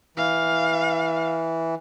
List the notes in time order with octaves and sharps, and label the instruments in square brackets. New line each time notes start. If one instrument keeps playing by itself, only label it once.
[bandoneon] E3 [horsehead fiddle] F5